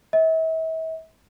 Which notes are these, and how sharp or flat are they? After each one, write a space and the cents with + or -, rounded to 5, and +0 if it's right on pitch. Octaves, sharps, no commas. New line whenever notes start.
E5 -40